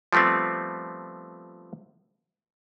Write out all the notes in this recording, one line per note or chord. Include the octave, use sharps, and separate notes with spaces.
F3 G3 A3 B3 C4